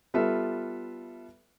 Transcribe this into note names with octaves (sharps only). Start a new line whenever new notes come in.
G3 B3 F4 A4 B4 E5